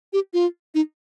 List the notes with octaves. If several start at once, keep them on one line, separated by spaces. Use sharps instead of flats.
G4
F4
D#4